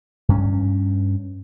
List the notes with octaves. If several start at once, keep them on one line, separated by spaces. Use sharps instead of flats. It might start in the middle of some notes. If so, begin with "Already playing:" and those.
G2 C#4